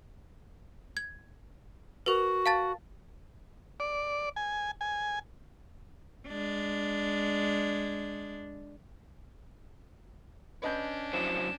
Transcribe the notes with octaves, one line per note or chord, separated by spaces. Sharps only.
G#6
F#4 A#4 B4
F5 A5 A6
D5
G#5
G#5
G#3 D4
C#4 D4 B4 D#5 G6
F#3 E4 C5 E7